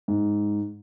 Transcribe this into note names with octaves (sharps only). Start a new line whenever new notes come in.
G#2